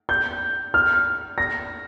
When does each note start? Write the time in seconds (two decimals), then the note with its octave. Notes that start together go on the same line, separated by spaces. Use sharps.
0.09 G6
0.74 F6
1.38 A#6